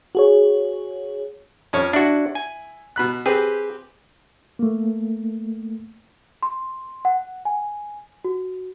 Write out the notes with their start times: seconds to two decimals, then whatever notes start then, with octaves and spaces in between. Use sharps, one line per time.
0.15 F#4 G#4 C#5
1.73 F2 C#4 C#5
1.93 D4 E4 F#4
2.35 G#5
2.96 B2 B5 F#6
3.26 C4 G4 G#4 B4
4.59 A3 A#3
6.43 C6
7.05 F#5
7.45 G#5
8.25 F#4